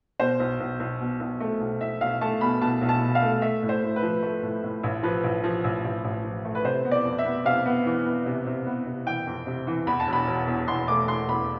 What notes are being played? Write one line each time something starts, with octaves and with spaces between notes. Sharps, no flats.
B2 C5
B1
B1
B1
B2
B1
A3
B1
B1 E5
B1 F5
A3 A5
B2 B5
B2 A5
B1
A5
B2
F5
A3
A3 E5
A2
C5
A2
B4
F3
A3
A2
A2
A1
F3 B4
A1
F3
A1
A1
A1
F3
A3
B4
C3 C5
B3
D5
F2
E5
B3
C3 F5
B3
E3
B3
C3
C3
B3
C3
E3 G5
F2
C3
E3
E2 B5
A5
E1
B5
E1
E2
E2 C6
A3 D6
A3 C6
E2 B5